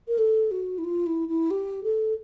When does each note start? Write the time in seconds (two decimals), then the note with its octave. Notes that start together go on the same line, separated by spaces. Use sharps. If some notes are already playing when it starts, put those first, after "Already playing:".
0.08 A#4
0.18 A4
0.51 F#4
0.78 E4
0.84 F4
1.06 E4
1.29 E4
1.51 G4
1.84 A4